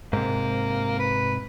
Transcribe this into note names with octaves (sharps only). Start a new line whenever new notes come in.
G#2 C3 A#3
B4